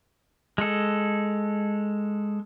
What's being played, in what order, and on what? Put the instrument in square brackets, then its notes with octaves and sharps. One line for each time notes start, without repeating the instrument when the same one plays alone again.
[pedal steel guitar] G#3 A4